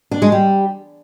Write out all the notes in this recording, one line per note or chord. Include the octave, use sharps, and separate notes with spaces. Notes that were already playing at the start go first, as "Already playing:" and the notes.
D4
G#3
G3